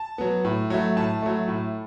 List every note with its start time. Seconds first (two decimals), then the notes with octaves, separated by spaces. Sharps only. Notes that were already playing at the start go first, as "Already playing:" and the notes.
Already playing: A5
0.18 F#3 B3
0.45 A2
0.70 F#3 A3
0.97 A2 A5
1.22 F#3 A3
1.48 A2